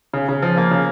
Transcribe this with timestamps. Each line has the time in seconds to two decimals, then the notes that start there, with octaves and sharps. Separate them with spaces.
0.14 C#3
0.29 C#3
0.43 F3
0.57 A#3
0.71 C#3